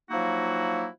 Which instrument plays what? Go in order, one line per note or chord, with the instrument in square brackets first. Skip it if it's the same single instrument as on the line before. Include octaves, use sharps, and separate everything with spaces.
[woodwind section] F3 F#3 A#3 D#4 E4 F#4